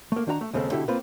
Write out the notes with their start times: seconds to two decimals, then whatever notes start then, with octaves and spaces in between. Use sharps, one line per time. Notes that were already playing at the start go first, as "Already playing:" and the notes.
0.12 A3 A#3
0.27 D#3 D4 F#4 A#5
0.41 A3
0.54 D#2 C#3 G#3 C4 A4
0.72 B2 D3 E4 G4 A4
0.88 A#3 C4 F4 B4